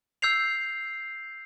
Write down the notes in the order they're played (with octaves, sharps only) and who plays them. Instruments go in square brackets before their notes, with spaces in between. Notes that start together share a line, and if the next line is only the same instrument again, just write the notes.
[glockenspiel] E6 G6 C7 F7